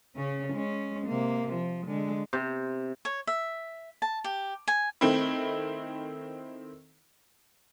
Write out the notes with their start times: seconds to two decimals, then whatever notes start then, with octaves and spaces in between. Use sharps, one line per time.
0.16 C#3 C#4
0.53 G#3 C#4
1.07 C3 A#3
1.53 F3
1.86 D3 G#3
2.33 C3
3.05 C#5
3.27 E5
4.02 A5
4.24 G4
4.68 G#5
5.01 D#3 A3 C4 E4